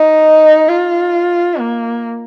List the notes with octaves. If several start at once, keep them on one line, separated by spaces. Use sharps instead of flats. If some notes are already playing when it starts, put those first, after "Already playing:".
Already playing: D#4
F4
A#3